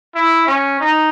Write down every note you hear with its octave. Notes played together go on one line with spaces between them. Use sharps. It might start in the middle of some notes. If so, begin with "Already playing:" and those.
E4
C#4
D#4